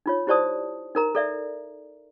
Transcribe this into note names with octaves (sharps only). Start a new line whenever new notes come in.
D#4 F4 C#5
E4 G4 C5 D5 A5 D#6
D#4 A#4 A#5
A4 D5 E5